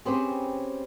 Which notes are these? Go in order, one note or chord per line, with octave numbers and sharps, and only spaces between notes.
C4 C#4 G4 G#4 B4 C5